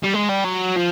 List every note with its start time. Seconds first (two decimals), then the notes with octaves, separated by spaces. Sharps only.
0.04 G3
0.14 G#3
0.29 G3
0.44 F#3
0.76 F3